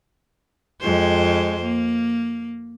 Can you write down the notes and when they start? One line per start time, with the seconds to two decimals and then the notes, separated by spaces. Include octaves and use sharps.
0.80 F2 G#3 C5
1.62 A#3